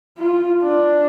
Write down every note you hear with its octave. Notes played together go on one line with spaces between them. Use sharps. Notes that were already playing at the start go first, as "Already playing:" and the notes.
F4
D4